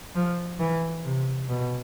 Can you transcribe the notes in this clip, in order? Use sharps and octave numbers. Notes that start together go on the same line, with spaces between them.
F3
E3
C3
B2